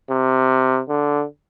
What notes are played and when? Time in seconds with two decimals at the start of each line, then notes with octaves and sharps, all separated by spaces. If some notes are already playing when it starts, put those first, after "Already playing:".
0.10 C3
0.89 D3